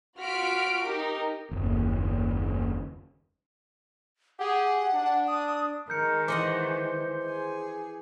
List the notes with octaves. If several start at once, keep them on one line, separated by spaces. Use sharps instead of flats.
F4 F#4 F6 B6 D7
D#4 G4 A#4
F#1 D#2
G4 G#4 F#5
D4
D#6
D#3 G#3 A#4 G6 C#7
E3 C5 D#5 F#5 D6 C#7
G#4